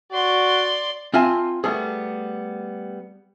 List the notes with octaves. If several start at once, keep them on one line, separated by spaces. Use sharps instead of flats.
F#4 D5 C6
C4 F4 E5 G#5 A5
G3 A3 B3 G#4